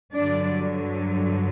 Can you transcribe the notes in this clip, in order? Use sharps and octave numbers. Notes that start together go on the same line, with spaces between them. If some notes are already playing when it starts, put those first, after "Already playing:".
G2 D3 F#3 D4 D5